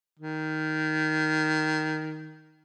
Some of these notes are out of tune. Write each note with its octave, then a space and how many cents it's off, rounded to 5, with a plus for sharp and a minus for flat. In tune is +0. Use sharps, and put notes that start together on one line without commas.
D#3 +0